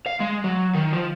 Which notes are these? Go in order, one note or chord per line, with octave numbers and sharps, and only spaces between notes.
F5
G#3
F#3
D#3
F3